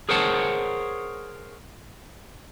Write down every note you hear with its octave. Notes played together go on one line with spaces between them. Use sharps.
G#4 A#4 C5 C#5 F#5 A5